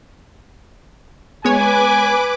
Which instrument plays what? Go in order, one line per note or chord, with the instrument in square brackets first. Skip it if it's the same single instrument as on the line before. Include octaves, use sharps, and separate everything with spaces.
[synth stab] G#3 B3 C#5 [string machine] B4 D6 [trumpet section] G#5